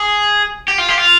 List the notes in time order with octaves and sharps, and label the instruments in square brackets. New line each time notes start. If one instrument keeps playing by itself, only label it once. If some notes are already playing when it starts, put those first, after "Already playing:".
Already playing: [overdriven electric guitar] G#4
G4
F4
G4
F4